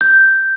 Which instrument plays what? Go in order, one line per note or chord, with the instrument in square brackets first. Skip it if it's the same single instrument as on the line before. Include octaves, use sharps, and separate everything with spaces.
[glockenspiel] G6